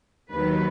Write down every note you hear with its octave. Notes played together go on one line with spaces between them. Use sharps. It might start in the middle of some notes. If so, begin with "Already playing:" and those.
D#2 D#3 F#3 B4